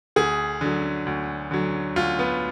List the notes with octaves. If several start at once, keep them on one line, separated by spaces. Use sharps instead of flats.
D2 G#4
D3 F#3
D2
D3 F#3
D2 F4
B3